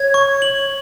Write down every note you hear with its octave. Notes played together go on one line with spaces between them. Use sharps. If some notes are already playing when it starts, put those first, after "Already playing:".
Already playing: C#5 G#6
C#6
F#7